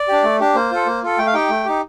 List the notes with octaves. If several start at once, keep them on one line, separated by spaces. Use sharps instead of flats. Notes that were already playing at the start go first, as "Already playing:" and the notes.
Already playing: D5
D4 G4
A3
D4 G4
A#3 C5
F4 A4
A#3
F4 A4
A3 G5
F5
D#4 G4 G5
A3
D#4 G4